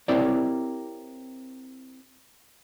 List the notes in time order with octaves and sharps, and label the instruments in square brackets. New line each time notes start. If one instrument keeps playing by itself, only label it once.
[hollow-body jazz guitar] C4 E4 G4 A#4 C#5 D5